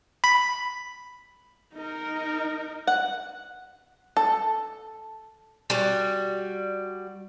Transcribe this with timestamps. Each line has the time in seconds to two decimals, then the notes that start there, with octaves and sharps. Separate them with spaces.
0.24 B5
1.74 D#4 A#4
2.87 F#5
4.17 A4
5.70 G3 F#4